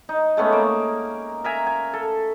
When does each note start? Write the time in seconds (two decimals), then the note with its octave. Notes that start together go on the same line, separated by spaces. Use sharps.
0.09 D#4
0.37 G#3 A3 B3 C#4
0.53 A#3
1.44 A#4 E5 G#5 A#5
1.67 G#5
1.93 A4